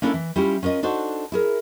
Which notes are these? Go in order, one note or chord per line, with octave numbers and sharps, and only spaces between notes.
A#3 C#4 D4 E4 A4
E3
G3 C#4 E4 F4 G4
C#4 F4 A#4 D#5
D4 D#4 F#4 A4 C5
E4 G#4 A#4